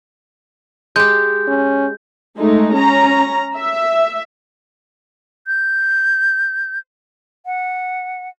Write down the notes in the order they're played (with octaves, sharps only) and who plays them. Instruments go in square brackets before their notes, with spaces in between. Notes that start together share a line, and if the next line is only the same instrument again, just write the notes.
[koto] G#3 G4 [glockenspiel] G6
[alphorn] C#4
[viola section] G#3 A3 D#4
C#4 A#5
E5
[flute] G6
F#5